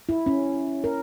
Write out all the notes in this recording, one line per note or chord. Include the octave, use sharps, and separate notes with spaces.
E4
C#4
A#4